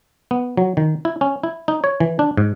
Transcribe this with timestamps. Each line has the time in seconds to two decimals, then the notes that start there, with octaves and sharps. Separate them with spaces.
0.31 B3
0.57 F#3
0.77 D#3
1.05 E4
1.21 C#4
1.44 E4
1.68 D#4
1.84 C#5
2.00 E3
2.19 D4
2.37 G#2